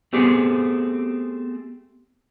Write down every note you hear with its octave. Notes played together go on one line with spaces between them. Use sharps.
A3 B3 C4 G4 G#4